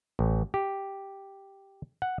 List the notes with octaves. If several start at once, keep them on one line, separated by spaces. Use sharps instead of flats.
A1
G4
F#5